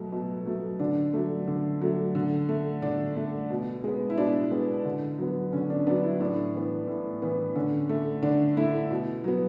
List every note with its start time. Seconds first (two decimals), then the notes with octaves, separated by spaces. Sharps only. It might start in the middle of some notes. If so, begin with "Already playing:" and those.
Already playing: B2 F#3 A3
0.12 B2
0.46 F#3 A3
0.80 D3 D4
1.13 F#3 A3
1.48 D3
1.82 F#3 A3
2.15 D3
2.49 A3
2.82 D3 D4
3.16 A3
3.50 B2
3.84 G#3 B3
4.10 E4
4.18 B2 D4
4.51 G#3 B3
4.85 D3
5.18 F#3 B3
5.53 D3 C#4
5.70 D4
5.87 F#3 B3 D4
6.03 E4
6.20 A2 D4
6.54 E3 B3
6.88 A2
7.22 E3 B3
7.55 D3 C#4
7.89 A3
8.22 D3 D4
8.57 A3 E4
8.91 B2
9.24 F#3 B3